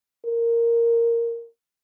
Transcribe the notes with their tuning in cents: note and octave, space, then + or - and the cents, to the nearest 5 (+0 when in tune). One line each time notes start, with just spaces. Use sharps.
A#4 -5